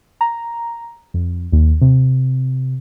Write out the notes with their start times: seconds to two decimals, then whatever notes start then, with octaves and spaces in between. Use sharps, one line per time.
0.21 A#5
1.14 F2
1.52 D#2
1.81 C3